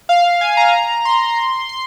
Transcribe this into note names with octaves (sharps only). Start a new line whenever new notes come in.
F5
G#5
A#5
C6
C6